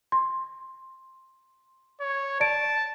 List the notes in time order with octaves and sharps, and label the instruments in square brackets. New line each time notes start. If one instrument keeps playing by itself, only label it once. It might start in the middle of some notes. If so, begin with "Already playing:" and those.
[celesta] C6
[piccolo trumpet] C#5
[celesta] D5 D7 [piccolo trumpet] A5